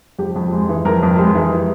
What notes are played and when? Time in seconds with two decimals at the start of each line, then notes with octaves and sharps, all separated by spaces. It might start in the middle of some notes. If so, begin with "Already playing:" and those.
0.19 F2 G4
0.36 F2
0.53 G#3
0.69 E3
0.85 F2 A#4
1.03 F2
1.18 G#3 G4
1.35 E3